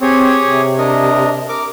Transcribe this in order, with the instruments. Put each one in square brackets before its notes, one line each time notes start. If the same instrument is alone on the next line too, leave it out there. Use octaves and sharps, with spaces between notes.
[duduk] C4 [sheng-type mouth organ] G4 G#4 C#5
[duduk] C3
[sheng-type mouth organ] D4 A#4 D#5
A#4 D6